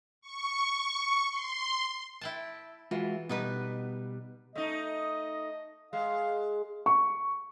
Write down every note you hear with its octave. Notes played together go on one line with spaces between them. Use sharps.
C#6
C6
E4 G5 A5
E3 G#3 F4 F#4
B2 G3 B3 D#4 B4
A3 D#4 D#5
G#3 F5
C#6